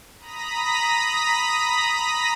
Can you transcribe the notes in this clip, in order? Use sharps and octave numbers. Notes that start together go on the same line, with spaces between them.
A#5 B5 D#6 A#6 B6